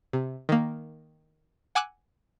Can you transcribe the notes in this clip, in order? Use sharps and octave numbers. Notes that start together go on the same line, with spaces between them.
C3
D#3 A#3
F#5 G#5 D6 E6 F#6